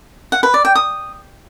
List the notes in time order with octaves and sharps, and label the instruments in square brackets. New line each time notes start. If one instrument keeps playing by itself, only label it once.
[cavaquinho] F#5
B4
D5
G5
D#6